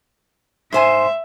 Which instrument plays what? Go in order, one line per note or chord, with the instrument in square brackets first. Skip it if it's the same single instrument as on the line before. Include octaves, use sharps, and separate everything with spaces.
[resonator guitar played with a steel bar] G#2 C5 G#5 [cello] E5